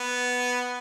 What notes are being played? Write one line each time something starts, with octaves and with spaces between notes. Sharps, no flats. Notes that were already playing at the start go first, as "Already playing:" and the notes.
Already playing: B3